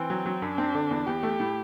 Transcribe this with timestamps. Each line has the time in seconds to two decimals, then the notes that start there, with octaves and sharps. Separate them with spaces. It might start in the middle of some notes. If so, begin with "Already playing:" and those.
Already playing: E3 C4
0.10 F#3
0.26 F#3
0.42 F#2 D4
0.58 C4
0.75 D3
0.91 E2
1.07 E2 G4
1.23 A3
1.40 A2